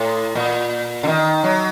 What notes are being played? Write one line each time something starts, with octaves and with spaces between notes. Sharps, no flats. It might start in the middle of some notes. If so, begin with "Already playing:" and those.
Already playing: A2
A#2
D3
D#3
F#3